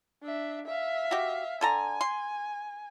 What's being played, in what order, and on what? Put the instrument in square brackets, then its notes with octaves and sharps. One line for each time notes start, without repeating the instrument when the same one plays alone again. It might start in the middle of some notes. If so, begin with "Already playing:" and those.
[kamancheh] D4 E5
E5 F5
[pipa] F#4 G4
[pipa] D3 A4 A#5 [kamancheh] G#5
[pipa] C6